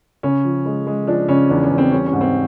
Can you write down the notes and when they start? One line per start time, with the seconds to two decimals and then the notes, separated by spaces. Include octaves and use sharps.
0.23 C#3 C#4
0.44 F3
0.66 G#3
0.87 G#3
1.07 F3 D4
1.28 C#3 C#4
1.50 E2 D4
1.64 C#4
1.71 E2
1.78 C4
1.92 G3 C#4
2.07 C#4
2.13 G#2
2.21 C4